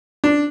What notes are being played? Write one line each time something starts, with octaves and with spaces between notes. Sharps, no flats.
D4